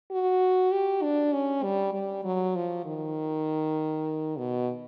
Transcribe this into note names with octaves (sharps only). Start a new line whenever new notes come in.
F#4
G4
D4
C#4
G3
G3
F#3
F3
D#3
B2